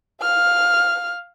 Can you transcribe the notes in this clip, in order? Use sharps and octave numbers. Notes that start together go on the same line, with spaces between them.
F5 F6